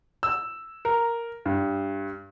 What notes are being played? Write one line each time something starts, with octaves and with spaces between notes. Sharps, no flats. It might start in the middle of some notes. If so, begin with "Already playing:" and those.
E6
A#4
G2